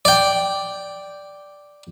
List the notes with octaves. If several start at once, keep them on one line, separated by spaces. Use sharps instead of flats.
D5 G5